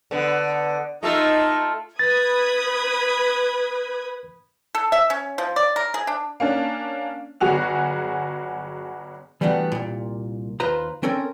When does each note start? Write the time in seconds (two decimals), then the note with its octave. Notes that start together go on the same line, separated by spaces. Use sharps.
0.11 D3 B3
1.03 A3 D#4 F4 A4
1.99 B4 B5 D#6 G#6 A6
4.75 A4
4.92 E5
5.10 C#4
5.38 F3
5.56 D5
5.76 A#4
5.94 G#4
6.07 D4
6.40 A#3 C#4 D4
7.41 G1 F#3 F#4 G#4 F7
9.41 E3 G3 A3 B3 D4 F#4
9.72 C2 A#2
10.60 D#2 F4 B4 C5 A#5
11.03 C4 C#4 A4 A#4